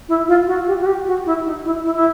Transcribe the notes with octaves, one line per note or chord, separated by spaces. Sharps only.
E4
F4
F#4
G4
F#4
G4
F#4
E4
D#4
E4
E4
E4